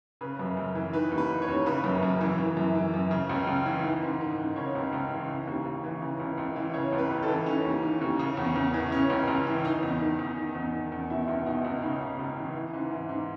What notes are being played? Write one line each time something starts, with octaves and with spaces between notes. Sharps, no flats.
C#3 B4
F#2
F#2
E3
D#3 B4
D#2
B4
D#3
C#5
D#2
C#3 B4
F#2
F#2
E3
E3
F#2
E3
F#2
C#3
C#2
C#2
E3
D#3
G#2
D#3
G#2
C#3 C#5
C#2
C#2
E3
C#3
D#2
D#2
E3
C#3
C#2
C#2
E3
C#3 C#5
C#2
B4
C#2
A4
E3
D#3 C#4
D#2
D#3
D#2
C#3
E2
E2
E3
C#3 C#4
C#2
C#2
E3
D#3 D#4
E2
D#3
E2
D#3
E2
D#3
E2
B2 E4
C#2
B2 D#4
C#2
C#3 D#4
C#2
C#2
E3
E3
G#2
E3
G#2